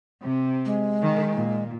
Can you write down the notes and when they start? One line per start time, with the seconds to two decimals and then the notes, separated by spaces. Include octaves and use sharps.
0.24 C3
0.65 G#3
1.03 D#3
1.34 A#2